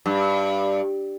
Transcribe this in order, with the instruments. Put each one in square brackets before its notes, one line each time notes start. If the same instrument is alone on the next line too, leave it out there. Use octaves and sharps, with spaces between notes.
[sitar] G2